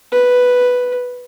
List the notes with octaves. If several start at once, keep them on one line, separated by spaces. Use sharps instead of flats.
B4